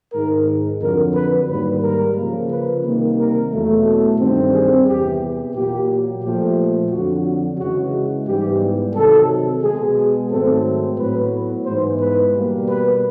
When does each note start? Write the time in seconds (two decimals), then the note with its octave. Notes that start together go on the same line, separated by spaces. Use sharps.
0.13 G#2 D#3 G#3 A#4
0.81 F2 D3 F#3 A#4
1.15 B4
1.49 G#2 D#3 G3 A#3 B4
1.82 A#4
2.17 C#3 F3 A#3
2.51 B4
2.84 C3 D#3 G3 A#3
3.18 A#4
3.52 E2 B2 F#3 A3
3.86 A4
4.19 G2 D#3 G3 C4
4.54 G#4
4.88 E2 C3 E3 G4
5.55 A#2 F#3 A#3 G4
6.23 A#2 F3 A3 G4
6.90 F2 D3 F#3 F#4
7.59 C#3 E3 G#3 F#4
8.26 G#2 E3 G3 B3 G4
8.94 C3 D#3 F#3 A4
9.62 B2 G#3 B3 G#4
10.30 G#2 D#3 F#3 A3 C4 A4
10.98 A2 F#3 B3 B4
11.65 G#2 E3 G#3 B3 C5
12.00 B4
12.33 B2 G3 A#3
12.68 B4